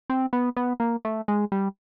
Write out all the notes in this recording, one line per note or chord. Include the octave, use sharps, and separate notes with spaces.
C4
B3
B3
A#3
A3
G#3
G3